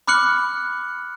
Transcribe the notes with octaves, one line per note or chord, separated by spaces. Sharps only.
B5 D6 F6 F#6 C#7 F#7